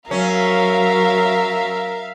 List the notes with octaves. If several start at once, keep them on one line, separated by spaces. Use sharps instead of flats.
F#3 C#4 A#4 E5 F5